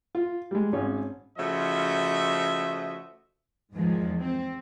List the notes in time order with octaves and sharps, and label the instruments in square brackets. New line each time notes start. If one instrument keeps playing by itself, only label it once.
[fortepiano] F4
G3 G#3
G#1 C#4
[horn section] C#3 F3 A3 F#4 D#5 E5
[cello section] E2 G#2 D#3 F3 G#3
C4